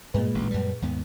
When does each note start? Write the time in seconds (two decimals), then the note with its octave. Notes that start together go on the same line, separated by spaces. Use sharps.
0.14 G2 A#2 G#3 B4
0.34 A1 D2
0.51 F#2 G3
0.82 D#2 G#2 B3